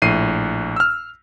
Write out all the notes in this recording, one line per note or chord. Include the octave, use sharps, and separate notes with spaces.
A#1 A2 C7 D#7
E6 F6